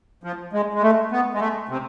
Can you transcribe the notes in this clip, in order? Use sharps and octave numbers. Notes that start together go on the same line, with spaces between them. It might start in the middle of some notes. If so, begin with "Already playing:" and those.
F3
G#3
G#3
A3
B3
G#3
A3
C3